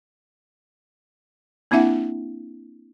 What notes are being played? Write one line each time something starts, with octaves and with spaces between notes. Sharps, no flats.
A#3 C4 D4 E4 E5 F#5